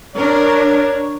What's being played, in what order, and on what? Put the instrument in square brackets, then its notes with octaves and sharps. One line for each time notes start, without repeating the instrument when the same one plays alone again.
[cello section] D4 A#4 [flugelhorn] C#5